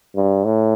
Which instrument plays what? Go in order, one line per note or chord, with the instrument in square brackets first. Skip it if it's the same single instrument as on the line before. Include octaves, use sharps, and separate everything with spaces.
[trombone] G2
A2